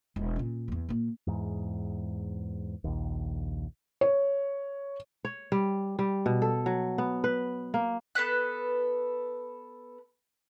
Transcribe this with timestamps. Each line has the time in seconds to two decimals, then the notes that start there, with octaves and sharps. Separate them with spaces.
0.16 E1
0.36 A#2 C#4
0.68 D1 E2
0.89 A#2 A#3
1.27 E2 G#2
2.84 A#1 D#2
4.01 C#5
5.25 C#5
5.52 G3
5.99 G3
6.26 B2
6.42 A4
6.66 F#3
6.98 B3
7.24 B4
7.74 A#3
8.15 B3 A4 B4 F#6